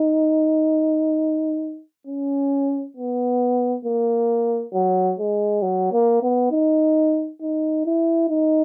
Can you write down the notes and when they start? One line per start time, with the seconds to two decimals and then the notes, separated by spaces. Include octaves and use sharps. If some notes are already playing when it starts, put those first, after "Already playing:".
Already playing: D#4
2.07 C#4
2.97 B3
3.85 A#3
4.74 F#3
5.19 G#3
5.62 F#3
5.93 A#3
6.23 B3
6.51 D#4
7.41 D#4
7.86 E4
8.29 D#4